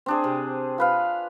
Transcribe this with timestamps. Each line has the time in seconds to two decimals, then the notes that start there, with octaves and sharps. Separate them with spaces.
0.06 C4 D4 G#4
0.24 C3
0.78 F4 B4 F5